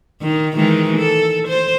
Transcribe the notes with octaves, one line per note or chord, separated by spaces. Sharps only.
D#3
D#3 E3 G#3
A4
C5